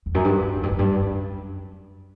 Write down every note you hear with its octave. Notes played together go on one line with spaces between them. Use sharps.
E2
F#2
G2
A2
F#2
G2
F#2
G2
F#2